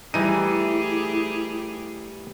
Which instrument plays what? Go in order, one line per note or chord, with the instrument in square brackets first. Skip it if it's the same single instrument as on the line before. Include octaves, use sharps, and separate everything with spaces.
[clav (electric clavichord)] E3 D#4 [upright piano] G3 D#7 [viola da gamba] A3 G4 G#4 [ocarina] E4